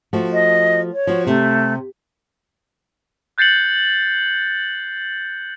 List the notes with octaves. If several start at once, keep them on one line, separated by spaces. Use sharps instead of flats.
F3 A3 F#4
D#5
C#5
F3 F#4
C3 A3
F#6 G6 A6 C7 C#7 F#7